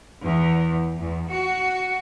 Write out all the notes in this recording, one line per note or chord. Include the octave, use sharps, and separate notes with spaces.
E2
E2
F#4